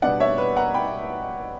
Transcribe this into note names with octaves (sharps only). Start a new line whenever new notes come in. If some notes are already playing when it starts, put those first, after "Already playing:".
B2 G3 B3 D4 D5 F#5
C#5 E5
B4
F#5 A#5
G5 B5